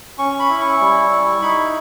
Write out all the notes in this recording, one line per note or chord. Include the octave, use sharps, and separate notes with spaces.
C#4 C#6
B5
E4
C#6
G3
E4
D#4 B5